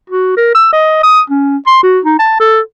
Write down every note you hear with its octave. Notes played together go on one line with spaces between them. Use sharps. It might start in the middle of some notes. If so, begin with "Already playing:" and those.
F#4
A#4
E6
D#5
D#6
C#4
C6
F#4
D#4
A5
A4